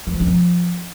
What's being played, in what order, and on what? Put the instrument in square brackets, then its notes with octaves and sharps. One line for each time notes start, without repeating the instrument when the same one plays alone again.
[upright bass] E3
F3
C#4
F3